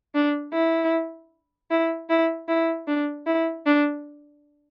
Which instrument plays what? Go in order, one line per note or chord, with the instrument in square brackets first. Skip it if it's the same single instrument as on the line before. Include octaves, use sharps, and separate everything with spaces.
[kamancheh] D4
E4
E4
E4
E4
D4
E4
D4